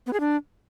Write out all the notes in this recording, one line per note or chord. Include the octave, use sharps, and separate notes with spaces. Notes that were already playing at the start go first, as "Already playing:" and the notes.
B3
G#4
D4